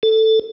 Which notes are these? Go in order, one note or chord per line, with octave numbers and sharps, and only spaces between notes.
A4